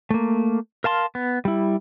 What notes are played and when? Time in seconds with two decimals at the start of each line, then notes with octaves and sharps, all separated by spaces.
0.11 A3 A#3
0.84 A#4 F5 A5 C6
1.15 B3
1.45 G3 E4